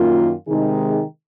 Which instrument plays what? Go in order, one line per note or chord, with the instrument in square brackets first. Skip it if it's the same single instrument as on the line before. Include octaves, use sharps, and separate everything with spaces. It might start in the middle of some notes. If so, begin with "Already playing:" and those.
Already playing: [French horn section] F#2 D#3 A#3 F4
C3 D#3 G#3 D#4 G#4